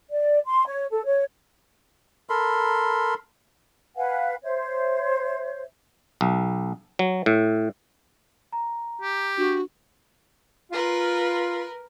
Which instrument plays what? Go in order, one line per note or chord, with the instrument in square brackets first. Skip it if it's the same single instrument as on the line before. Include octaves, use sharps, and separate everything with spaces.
[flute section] D5
C6
C#5
A4
C#5
[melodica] A4 A#4 B5 C6
[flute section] B4 F5 F#5 G#5
C5 C#5 E5
[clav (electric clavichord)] B1
F#3
A2
[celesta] A#5
[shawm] G4
[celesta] D4 [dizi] F#4
[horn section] F4 [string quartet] A#4 B4